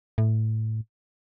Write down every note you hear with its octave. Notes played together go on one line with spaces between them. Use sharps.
A2